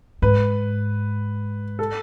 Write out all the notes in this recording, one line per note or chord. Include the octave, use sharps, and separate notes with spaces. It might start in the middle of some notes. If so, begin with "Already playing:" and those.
G#2 B4
A4